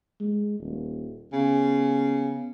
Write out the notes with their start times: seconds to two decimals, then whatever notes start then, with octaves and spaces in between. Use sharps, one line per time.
0.20 G#3
0.60 D#1
1.33 C#3 B3